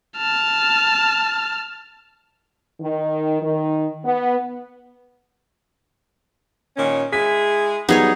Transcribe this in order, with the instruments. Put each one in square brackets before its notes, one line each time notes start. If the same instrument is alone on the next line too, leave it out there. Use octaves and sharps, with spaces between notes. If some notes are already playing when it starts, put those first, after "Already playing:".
[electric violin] A5 F6
[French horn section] D#3
D#3
B3
[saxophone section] A#2 D#3 C#4
[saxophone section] G#3 E4 G#4 [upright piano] B6
[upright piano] F#3 G3 B3 [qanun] D#4 G#4 C#5